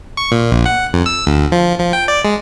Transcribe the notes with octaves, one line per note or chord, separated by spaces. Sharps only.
C#6
A#2
A#1
F#5
F2
E6
D2
F3
F3
G5
D5
G#3